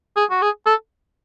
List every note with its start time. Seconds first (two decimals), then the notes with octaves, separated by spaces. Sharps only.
0.17 G#4
0.30 F#4
0.42 G#4
0.66 A4